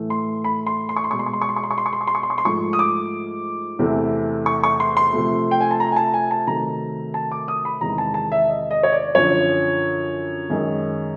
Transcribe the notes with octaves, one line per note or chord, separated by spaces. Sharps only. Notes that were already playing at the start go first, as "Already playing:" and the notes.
Already playing: A2 E3 A3
C6
B5
C6
C6
C#6
C6
B2 G#3 C#6
C6
C#6
C6
C#6
C6
C#6
C6
C#6
C6
C#6
C6
C#6
C6
C#6
C6
C#6
C6
G#2 F3 A3 C#6
D#6
D6
E2 C3 E3 A3
C#6
C#6
C6
C6
C3 F3 A3
G5
G#5
A5
A#5
G#5
A5
G#5
A5
C3 D#3 F#3 A3 A#5
A5
D6
D#6
B5
E2 C3 D#3 G#3 A#5
A5
A5
E5
D#5
D#5
C#5
D5
F#2 D3 F3 C#5
F#2 D#3 G#3